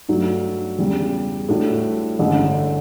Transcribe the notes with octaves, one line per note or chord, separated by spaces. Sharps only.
G2 F#3 A3 D4
E2 C#3 G3
A2 G3 D4 F#4
A1 G2 D3